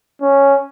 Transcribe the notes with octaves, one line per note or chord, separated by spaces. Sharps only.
C#4